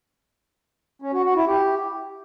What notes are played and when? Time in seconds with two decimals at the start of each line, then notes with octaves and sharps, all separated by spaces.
1.02 C#4
1.13 F#4
1.24 F#4
1.36 E4
1.47 G4